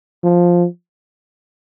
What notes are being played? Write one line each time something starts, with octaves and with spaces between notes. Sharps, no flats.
F3